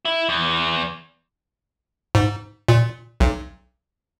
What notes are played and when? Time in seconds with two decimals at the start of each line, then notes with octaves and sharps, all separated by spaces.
0.05 E4
0.29 E2
2.15 G#2
2.68 A#2
3.20 B1